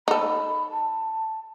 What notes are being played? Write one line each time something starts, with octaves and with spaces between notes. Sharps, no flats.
D#4 A4 B5
A5